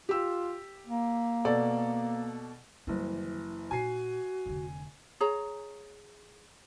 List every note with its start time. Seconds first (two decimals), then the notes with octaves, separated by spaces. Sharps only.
0.09 F4 G4 E6
0.87 A#3
1.45 B2 A4 D5
2.87 F#1 D#3 E3 G3
3.71 A#2 D#4 F#4 G#5 C7
4.46 F1 D3
5.20 G#4 C#5 A#5